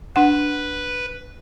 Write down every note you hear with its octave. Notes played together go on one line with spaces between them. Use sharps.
D4 B4 F#5